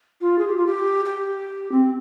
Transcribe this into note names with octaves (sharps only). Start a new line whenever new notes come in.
F4
G#4
G4
F4
G4
G4
C4